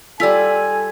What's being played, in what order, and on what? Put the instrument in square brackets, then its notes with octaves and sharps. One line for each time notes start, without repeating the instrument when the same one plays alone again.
[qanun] G3 F4 [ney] A4 [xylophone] D5 E6 B6 [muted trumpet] G#5